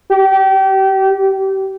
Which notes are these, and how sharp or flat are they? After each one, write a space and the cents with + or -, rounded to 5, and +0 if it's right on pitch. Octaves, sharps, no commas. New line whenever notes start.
G4 -30